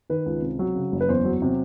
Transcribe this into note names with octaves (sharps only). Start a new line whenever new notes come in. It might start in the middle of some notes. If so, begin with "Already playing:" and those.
D#3 B4
C#2
C3
F#3
C#3
F#1
B4
E2 C5
F#3
C3